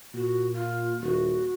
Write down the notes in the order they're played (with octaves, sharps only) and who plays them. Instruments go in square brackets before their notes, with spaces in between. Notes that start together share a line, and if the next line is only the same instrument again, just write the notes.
[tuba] A#2 [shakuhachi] F#4
[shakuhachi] F4
[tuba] D#1 [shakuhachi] F#4